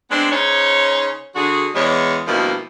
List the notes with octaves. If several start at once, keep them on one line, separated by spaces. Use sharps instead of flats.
G#3 B3 C4 D4
C#3 D#4 C5 C#5
D3 F#4 G#4
E2 G#3 C#5
G2 B2 D#3 F3 A#3 E4